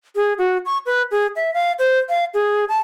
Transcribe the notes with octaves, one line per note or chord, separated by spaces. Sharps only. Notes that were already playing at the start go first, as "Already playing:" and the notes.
G#4
F#4
C#6
B4
G#4
E5
F5
C5
F5
G#4
A5